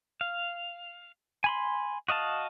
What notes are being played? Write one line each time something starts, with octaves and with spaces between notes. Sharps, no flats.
F5
G#5 B5 C6
F#4 D#5 F5 A5